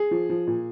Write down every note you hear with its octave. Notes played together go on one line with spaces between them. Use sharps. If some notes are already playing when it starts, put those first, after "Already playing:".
Already playing: G#4
F3
F3
A#2